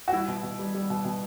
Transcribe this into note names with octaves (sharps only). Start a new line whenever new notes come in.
F#4
G3 E4
B2
B2
G3
G3
B2
B2